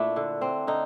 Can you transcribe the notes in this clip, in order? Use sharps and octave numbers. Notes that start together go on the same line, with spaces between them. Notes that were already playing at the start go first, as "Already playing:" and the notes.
Already playing: A#2 A3 D4 E4
D3
C4
D3 D#4